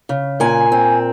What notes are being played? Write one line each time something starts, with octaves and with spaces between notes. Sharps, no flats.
C#3
A#2 G#5
C4